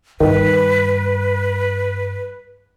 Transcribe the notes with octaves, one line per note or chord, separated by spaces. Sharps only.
G2 D#3 B4